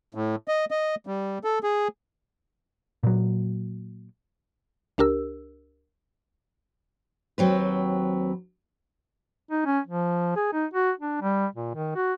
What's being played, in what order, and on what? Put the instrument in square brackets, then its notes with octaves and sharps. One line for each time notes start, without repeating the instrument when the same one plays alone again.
[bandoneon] A2
D#5
D#5
G3
A4
G#4
[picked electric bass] A#2 F#3
[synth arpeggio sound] C#2 D4 G4 A#4 E6
[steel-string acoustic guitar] D#2 F#3 C4 B4
[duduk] D#4
C#4
F3
G#4
D#4
F#4
D4
G3
A#2
D#3
F#4